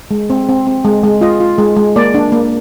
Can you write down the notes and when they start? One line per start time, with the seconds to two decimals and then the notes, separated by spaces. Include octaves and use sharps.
0.11 G#3
0.30 C4
0.49 C4
0.67 C4
0.85 G#3
1.04 G#3
1.21 F4 D#5
1.40 F4
1.58 G#3
1.76 G#3
1.96 A#3 D5
2.14 D4
2.32 A#3